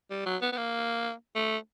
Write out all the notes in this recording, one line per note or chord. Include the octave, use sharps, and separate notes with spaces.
G3
F#3
B3
B3
A#3
A3